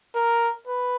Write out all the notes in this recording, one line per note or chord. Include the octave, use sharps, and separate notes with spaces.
A#4
B4